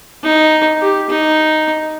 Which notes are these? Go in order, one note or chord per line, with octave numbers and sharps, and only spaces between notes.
D#4
G4
D#4